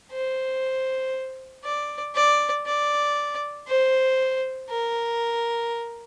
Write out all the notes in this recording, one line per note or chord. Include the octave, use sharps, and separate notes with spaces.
C5
D5
D5
D5
C5
A#4